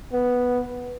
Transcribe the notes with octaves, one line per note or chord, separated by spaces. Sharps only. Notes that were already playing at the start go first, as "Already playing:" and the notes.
B3